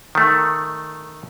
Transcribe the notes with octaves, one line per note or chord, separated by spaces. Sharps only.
D#3 A3